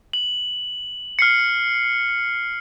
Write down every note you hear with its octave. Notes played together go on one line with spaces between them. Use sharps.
F#7
F6 C7 C#7